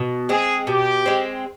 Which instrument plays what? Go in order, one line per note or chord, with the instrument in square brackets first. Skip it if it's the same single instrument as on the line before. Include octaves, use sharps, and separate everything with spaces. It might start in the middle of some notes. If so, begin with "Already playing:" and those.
Already playing: [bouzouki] B2
[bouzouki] G#3 C4 [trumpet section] G#4
[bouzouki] B2 [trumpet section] G4
[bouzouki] G#3 C4